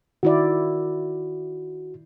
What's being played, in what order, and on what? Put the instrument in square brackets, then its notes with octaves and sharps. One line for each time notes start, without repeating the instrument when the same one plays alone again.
[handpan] D#3 E4 D5 [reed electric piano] F#4